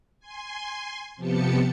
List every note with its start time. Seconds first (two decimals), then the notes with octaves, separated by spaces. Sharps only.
0.20 G#5 C6
1.16 C3 F3 B3 G4 A5 C#7